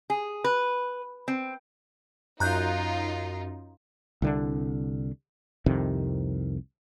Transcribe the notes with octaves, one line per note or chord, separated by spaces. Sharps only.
G#4
B4
C4
F#2 D#4 F4 A#5 F#6 G6
C2 D3 D4
C2 F2 C3 D#3